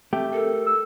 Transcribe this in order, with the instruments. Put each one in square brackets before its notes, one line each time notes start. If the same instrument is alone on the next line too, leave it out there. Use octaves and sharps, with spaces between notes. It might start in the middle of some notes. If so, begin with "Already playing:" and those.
[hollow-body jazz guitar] A3 G4 [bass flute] C4
[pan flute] A4 [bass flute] A#4
[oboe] E6